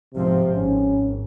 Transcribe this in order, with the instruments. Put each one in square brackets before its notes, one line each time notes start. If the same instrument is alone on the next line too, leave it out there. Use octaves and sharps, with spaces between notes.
[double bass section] G#2 F3 C4 [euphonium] C3
[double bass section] G#1 [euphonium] C#4